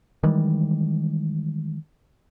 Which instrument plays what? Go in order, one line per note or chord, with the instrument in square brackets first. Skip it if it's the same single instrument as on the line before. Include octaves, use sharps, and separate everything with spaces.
[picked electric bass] D#3 E3 G3 G#3